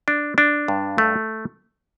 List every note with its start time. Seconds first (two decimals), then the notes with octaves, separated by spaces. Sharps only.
0.08 D4
0.38 D4
0.68 G2
0.98 A3